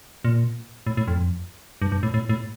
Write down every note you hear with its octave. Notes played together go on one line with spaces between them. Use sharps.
A#2
A2
A2
F2
G2
G2
A2
A2
A2